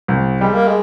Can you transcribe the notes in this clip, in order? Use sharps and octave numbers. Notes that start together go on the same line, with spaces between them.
C2
G3 G#3
A#3
G#3